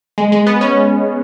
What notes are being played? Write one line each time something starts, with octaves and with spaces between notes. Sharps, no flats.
G#3
G#3
B3
C#4